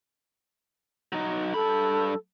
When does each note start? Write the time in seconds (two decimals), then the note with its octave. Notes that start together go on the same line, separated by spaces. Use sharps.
1.12 F#3 D#4
1.54 G2 A4 B5